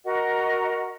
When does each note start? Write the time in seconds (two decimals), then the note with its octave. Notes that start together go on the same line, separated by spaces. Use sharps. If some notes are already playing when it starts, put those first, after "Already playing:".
0.04 F#4 A#4 D#5 F#5